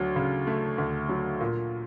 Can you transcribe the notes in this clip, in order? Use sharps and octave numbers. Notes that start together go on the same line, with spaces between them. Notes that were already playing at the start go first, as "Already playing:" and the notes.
Already playing: D2 F#3
C#3
A3
D2
F#3
A#2